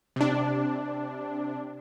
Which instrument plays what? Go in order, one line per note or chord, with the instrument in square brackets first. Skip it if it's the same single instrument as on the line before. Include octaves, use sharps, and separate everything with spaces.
[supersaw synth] C3 D4